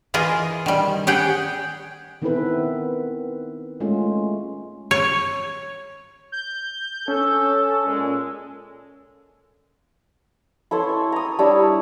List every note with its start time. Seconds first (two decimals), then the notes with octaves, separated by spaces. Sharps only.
0.14 E3 F4 G#4 A#4 D#5
0.66 D#3 G3
1.07 G4 G#4 F#5 G5
2.22 D#3 B3 C4 E4 A4 B4
3.80 G#3 A3 C#4 F4
4.91 C#5
6.32 G6
7.08 C#4 A4
7.87 A#2 G#3
10.71 E4 A4 C#5 C6
10.89 E5
11.12 A#5 D#6
11.39 G3 D4 E4 C#5